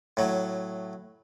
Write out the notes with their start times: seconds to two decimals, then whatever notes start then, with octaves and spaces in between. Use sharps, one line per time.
0.17 A2 F#3